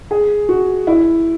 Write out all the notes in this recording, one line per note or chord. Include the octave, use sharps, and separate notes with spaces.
G#4
F#4
E4